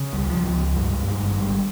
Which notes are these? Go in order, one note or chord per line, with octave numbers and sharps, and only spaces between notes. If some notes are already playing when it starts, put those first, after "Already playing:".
Already playing: C#3
C#2 G3
F3
C#2
F3
C#2
G2 G#3
G2
G#3
G#1
G#1 G3